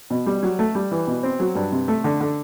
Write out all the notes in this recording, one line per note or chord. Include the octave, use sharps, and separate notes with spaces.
B2
G3
F#3
A3
G3
E3
B2
C4
F#3
G2
C3
A3
D3
D3